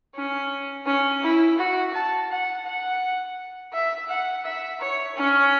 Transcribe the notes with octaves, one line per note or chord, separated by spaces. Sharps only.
C#4
C#4
E4
F#4
A5
F#5
F#5
E5
F#5
E5
C#5
C#4